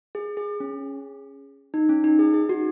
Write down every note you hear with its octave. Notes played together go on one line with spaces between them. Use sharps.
G#4
G#4
C#4
D#4
C#4
D#4
G#4
G#4
F#4